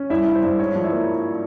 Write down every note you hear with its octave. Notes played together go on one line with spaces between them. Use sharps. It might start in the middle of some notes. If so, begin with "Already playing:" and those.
Already playing: C#4
G2 E4 E5
G2
C5
G2
G#2 C#5
F3
E4 E5
A#3